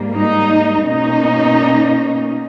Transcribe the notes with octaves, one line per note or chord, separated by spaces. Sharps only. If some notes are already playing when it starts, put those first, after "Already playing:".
Already playing: G#2 G3 A#3
D#4
B2 A#3 C#4 D#4